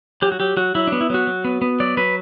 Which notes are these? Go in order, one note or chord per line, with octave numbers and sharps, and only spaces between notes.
F#3 G4
F#4
F#3 G4
F#3 F#4
F#3 E4
B3 D4
E4
F#3 F#4
F#3
B3
B3
F#3 D5
F#3 B4